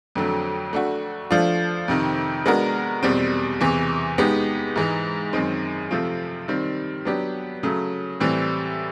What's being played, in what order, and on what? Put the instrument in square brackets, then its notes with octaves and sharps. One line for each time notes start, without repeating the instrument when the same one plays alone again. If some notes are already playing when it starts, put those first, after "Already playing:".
[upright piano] F2 D3 F#3 A3
A3 D4 F#4
F3 A3 D4 F4
F2 C3 D#3
G#3 B3 D4 F#4 A#4
E2 B2 G3 C4
E2 C3 E3
G#3 B3 D#4 G4
G#2 E3 G#3
F#2 D#3 G#3 C4
C3 F3 A3 C4 F4
D#3 G3 C4
F#3 B3 D4 G4
C#3 F#3 A3
A2 E3 G3 C4